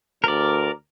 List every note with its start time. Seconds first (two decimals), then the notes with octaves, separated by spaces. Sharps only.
0.24 D2 A#4 D5